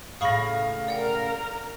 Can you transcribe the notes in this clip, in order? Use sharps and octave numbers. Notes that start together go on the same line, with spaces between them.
A2 C#3 F5 B5 C#6 D#6 A#6
A#4 D5 F#5 G5